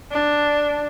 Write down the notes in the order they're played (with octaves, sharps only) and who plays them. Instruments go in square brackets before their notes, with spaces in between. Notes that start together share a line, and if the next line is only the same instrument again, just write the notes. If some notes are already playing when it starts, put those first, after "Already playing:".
[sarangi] D4